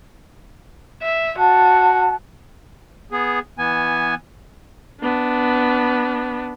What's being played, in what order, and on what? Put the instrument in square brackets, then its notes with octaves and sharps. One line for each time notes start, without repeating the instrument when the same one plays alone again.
[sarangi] E5
[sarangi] F#4 [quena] A5
[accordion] B3 G#4
E3 B3 G#5
[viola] B3 D4